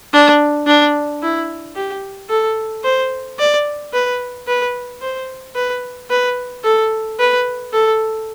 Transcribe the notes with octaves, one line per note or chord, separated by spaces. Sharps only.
D4
D4
E4
G4
A4
C5
D5
B4
B4
C5
B4
B4
A4
B4
A4